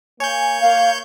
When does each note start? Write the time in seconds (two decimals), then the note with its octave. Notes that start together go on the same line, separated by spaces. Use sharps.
0.20 A#3 C#5 G#5 G6
0.61 A#3 F5